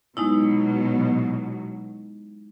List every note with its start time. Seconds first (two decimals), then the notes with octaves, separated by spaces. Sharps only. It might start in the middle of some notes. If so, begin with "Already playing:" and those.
0.17 B2 F#3 G#3 D#4 E4